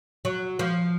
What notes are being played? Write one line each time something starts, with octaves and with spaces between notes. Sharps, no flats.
F#3
F3